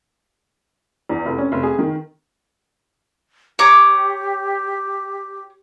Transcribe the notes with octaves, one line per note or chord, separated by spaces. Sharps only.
E2
F1
C#4
F1
G#4
D#3
G4 C#5 A#5 D6